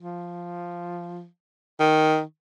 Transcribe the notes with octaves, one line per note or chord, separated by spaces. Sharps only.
F3
D#3